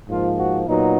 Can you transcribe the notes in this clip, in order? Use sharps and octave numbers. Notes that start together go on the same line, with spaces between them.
G#2 F3 A#3 F4
F#4
A#2 F#3 B3 D#4